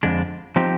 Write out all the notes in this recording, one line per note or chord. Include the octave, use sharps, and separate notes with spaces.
F2 D3 G#3 D4
F3 C4 D#4 G4